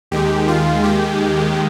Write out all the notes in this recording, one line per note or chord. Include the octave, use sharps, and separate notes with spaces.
D#2 D#3 G#3 G4
F4
G4